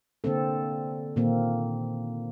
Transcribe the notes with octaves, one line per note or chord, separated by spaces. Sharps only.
D3 A#3 C4 A4
A#2 D#3 A#3 C4